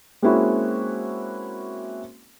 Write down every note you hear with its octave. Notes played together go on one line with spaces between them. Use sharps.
G#3 A#3 C4 C#4 E4 F#4